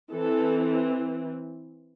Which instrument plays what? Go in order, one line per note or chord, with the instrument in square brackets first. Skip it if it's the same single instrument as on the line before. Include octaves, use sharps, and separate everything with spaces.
[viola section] E3 C4 A4